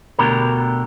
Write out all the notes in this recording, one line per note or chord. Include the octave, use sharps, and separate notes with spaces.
D2 B2 D3 G4 A#4